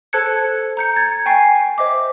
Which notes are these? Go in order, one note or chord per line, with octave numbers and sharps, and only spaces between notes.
A4 C5 A5 F#6 G#6 C#7
A#5 G6 C#7
G#6 A6
G5 G#5 C#6 C7
C5 D#5 E5 D6